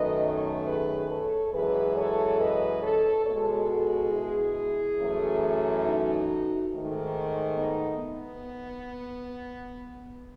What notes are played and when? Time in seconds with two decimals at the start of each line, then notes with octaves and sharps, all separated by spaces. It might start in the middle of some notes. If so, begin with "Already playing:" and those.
Already playing: F#2 D#3 A3 B4 D#5
0.23 A4 C#5
0.67 G#4 B4
1.10 A4 C#5
1.53 F#2 E3 G#3 G#4 B4
1.96 A4 C#5
2.40 B4 D#5
2.82 A4 C#5
3.25 B2 G#3 A4 C#5
3.69 F#4 A4
4.12 E4 G#4
4.98 F#2 E3 A3
5.85 D#4 F#4
6.71 G#2 D#3 A3
7.57 B3 D#4
8.00 B3